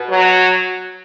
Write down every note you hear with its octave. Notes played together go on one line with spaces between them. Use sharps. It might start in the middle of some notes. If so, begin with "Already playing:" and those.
Already playing: B2
F#3